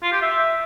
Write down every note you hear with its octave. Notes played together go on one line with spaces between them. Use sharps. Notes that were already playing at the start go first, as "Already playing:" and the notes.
F4
G4
E5